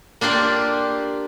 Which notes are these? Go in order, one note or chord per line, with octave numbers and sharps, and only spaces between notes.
A#3 D4 F4 G4 D5